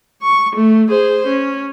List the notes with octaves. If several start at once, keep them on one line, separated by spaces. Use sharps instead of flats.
C#6
A3
G#4 C5
C#4